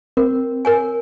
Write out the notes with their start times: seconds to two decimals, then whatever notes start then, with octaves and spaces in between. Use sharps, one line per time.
0.17 C4 A#4
0.65 A#4 C#5 G#5